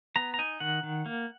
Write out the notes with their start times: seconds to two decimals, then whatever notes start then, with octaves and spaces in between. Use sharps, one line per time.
0.16 B3 A#5
0.34 A#5
0.39 D#4 G#5
0.60 D#3 F#5
0.83 D#3
1.06 A#3